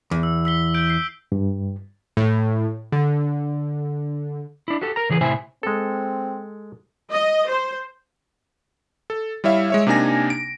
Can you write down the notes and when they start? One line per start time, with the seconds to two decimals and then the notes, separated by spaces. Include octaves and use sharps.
0.11 E2
0.23 E6
0.45 E6 B6 G7
0.74 G6 D7
0.90 C7
1.32 G2
2.17 A2
2.92 D3
4.68 D4 E4
4.82 F#4 G4 A4
4.96 A#4 A#5
5.10 C#3 E3 G#4 A#4 B4
5.21 A2 C3 E4 C5 E5 G#5
5.63 G#3 C4 A4
7.11 D#5
7.48 C5
9.10 A4
9.44 G3 E4 C#5 E5 F5
9.70 G#3 C#5 E5
9.87 C3 A#3 D4 D#4 G#5 A#6
10.30 D7